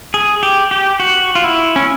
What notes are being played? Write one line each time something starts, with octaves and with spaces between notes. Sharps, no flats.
G#4
G4
G4
F#4
F4
E4
C#4